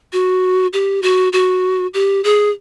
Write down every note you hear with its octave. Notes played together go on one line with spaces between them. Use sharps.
F#4
G4
F#4
F#4
G4
G#4